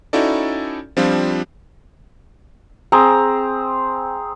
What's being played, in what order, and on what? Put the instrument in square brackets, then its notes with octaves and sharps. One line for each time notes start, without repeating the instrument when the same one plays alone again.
[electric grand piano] C#4 D#4 E4 F#4 A4 D5
F3 G3 C4 D4 F4
[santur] C4 G#4 A#5